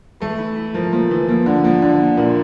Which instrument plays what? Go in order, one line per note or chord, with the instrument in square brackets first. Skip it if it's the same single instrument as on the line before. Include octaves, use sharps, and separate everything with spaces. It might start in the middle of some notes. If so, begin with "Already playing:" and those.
[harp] E3 [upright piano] A3
[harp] E4
E4
[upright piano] F3 [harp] A#4
[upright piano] F3 [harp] A#3
[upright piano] E3 [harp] E4
[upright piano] F3 [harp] A#3
[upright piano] D3 [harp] A#3
[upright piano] F3 [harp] A#3
[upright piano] D3 [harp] E3
[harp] A#3
[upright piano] A#2 [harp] E4